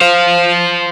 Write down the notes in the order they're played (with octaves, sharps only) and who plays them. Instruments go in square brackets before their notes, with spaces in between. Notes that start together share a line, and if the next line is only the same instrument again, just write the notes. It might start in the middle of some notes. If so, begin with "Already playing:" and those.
[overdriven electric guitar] C5 F5